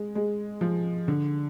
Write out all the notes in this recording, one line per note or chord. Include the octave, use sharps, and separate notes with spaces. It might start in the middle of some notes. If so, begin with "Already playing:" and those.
Already playing: G#3
G#3
F3
D3